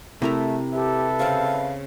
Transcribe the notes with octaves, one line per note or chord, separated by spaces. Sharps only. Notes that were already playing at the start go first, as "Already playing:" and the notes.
C3 A3 E4 A#4 A#5
G4 A4 B4 E5
C#3 C4 F5